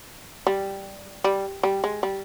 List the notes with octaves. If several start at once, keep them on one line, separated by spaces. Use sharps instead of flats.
G3
G3
G3
G#3
G3